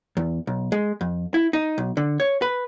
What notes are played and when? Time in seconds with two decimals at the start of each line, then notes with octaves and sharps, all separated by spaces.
0.17 E2
0.47 B1
0.72 G#3
1.01 F2
1.34 E4
1.53 D#4
1.78 B1
1.97 D3
2.20 C#5
2.42 B4